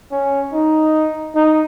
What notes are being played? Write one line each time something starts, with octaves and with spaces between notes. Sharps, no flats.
C#4
D#4
D#4